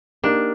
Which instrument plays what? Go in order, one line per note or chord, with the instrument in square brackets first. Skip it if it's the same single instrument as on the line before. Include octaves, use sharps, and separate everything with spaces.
[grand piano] A#3 D#4 G4 A#4 [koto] D4